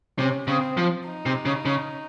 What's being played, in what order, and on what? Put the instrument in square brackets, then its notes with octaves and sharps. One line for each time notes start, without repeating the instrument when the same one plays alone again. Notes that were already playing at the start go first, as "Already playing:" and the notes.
[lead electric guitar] C3 [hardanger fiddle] C#4
[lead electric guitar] C#3 [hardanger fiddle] C4
[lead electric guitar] F3
[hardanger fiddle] D#4
[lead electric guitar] C3
C#3
C#3